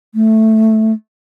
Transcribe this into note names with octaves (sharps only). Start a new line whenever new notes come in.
A3